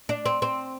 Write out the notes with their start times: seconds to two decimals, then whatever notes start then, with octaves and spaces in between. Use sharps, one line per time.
0.09 D4
0.26 C4
0.42 C4